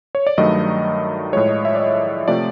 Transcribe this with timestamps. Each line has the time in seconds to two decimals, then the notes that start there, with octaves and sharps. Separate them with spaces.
0.15 C#5
0.27 D5
0.38 G2 D#3 F#3 A3 D#5
1.33 A2 F3 G#3 C#5
1.49 D#5
1.65 E5
1.75 D5
1.80 D#5
2.28 C3 F3 A3 D5